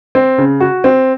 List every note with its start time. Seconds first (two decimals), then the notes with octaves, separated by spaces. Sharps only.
0.15 C4
0.38 C#3
0.60 F#4
0.84 C4